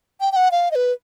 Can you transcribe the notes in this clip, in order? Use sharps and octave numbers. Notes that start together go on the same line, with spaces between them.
G5
G5
F#5
F5
D#5
B4